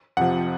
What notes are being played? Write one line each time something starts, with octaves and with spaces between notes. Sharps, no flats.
F2 C3 F3 F#5